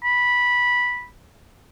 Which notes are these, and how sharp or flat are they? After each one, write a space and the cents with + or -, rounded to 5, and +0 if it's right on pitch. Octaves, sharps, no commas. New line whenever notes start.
B5 -10